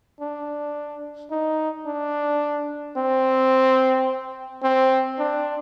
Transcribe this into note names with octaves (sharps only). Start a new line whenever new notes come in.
D4
D#4
D4
C4
C4
D4